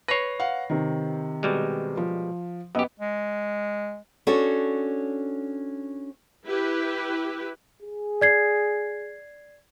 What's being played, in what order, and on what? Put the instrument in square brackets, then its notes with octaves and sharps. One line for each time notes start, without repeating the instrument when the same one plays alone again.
[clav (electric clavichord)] B4 C#5 [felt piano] A#6 C7
[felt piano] F5 F#5
C3 D#3
[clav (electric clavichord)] B2 G3 G#3
[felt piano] F3
[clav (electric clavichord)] F#2 G4 [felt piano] B3 D#5
[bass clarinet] G#3
[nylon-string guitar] C#4 D4 F#4 A4 C#5
[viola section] E4 G4 B4
[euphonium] G#4
[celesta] D5 G#6 C7